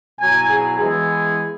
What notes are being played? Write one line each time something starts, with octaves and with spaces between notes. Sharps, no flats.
B2 F#3 E4 G#5
G#4
E3 G#3 B3 E4 G#4